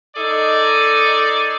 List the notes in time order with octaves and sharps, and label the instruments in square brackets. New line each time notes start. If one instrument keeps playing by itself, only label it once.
[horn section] D#4 G#4 A4 D5